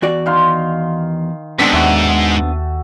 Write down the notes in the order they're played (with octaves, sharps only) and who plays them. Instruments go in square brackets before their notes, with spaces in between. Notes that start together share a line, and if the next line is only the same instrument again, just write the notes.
[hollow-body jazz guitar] E2 F#4 D5
[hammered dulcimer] D#3 F5 C6
[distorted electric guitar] G#2 [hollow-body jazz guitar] B3 C4 D4 [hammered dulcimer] G4 A4 [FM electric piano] B6
[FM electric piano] D#2 [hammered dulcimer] F#4 E5